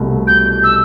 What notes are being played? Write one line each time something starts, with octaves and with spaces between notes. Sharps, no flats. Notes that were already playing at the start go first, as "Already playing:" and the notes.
Already playing: C2 B2 A3
G6
E6